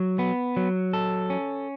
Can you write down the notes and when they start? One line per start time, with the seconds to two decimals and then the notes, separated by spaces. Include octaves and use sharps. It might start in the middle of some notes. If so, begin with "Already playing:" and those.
Already playing: F#3
0.19 B3
0.56 F#3
0.93 A4
1.30 C#4